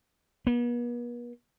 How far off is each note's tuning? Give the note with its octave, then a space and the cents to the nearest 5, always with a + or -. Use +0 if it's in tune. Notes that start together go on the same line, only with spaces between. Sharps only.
B3 -45